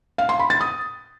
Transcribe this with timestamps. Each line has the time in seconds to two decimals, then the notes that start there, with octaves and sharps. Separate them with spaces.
0.18 F5
0.29 C6
0.40 B5
0.50 A6
0.61 D#6